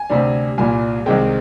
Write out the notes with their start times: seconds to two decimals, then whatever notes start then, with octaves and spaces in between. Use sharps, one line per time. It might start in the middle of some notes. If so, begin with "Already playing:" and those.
Already playing: G#5
0.10 D2 C3 G3 D4
0.58 C2 A#2 G3 G#5
1.06 C2 C3 D#3 G#3 C4 G5